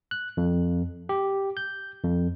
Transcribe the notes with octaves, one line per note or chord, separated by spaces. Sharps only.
F#6
F2
G4
G6
F2